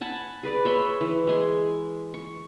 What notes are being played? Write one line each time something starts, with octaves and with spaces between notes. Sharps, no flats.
F#5 G#5 A5 B5
G#4 B4 D5
C#5 E5 B5 C6
E3
G#3 G#5 C6
C#6